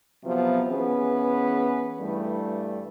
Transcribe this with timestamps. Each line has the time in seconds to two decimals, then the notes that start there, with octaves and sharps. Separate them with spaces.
0.24 C3 F3 F#3 B3
0.69 E3 B3 C#4 G#4 B4
2.01 G2 E3 G3 A3